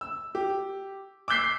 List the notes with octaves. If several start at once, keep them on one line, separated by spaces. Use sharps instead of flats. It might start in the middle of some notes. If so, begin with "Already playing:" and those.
E6
G4
D6 E6 F#6 G6 B6 C7